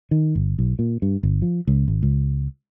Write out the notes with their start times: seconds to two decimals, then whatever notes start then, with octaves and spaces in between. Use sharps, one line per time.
0.11 D#3
0.35 G1
0.58 B1
0.79 A#2
1.02 G2
1.23 G1
1.42 F3
1.67 C#2
1.88 G#1
2.03 C#2